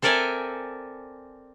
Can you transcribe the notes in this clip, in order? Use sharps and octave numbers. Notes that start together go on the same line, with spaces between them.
C4 A4 A#4 D5 E5 G#5